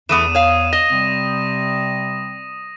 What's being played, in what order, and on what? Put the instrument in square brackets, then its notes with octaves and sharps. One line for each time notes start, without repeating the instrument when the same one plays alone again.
[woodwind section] E2 [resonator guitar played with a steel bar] E3 A3 B3 [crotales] D#6 D#7 E7
[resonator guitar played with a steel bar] C#5 F5
[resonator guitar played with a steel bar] D#5 [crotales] A#6
[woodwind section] C3 G3 C4